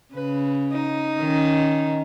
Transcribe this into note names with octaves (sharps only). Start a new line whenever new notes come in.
C#3 B4
D#4
D#3 C#4